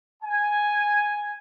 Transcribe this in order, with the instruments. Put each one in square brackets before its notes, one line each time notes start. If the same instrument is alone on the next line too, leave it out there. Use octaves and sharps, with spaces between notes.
[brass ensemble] G#5